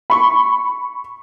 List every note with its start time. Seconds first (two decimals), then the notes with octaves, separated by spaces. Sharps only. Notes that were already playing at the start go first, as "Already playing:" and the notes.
0.10 B5 C#6